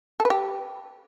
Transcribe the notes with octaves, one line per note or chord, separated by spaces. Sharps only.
A4
B4
G4